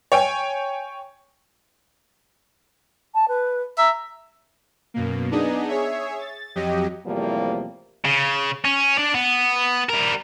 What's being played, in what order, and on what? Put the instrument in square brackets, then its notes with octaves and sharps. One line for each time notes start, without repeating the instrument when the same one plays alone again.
[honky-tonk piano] C#5 G5 G#5
[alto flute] A5
B4
[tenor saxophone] E5 [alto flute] A#5
[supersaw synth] F#2 B2 A#3
B3 D4 D#4 G#4 D#5
G#4 C#5 E5
A6
F2 F#3 G4 D#5
[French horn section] E2 A2 C3 F3 G3 A#3
[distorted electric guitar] C#3
C#4
D4 D5
B3
G3 A#4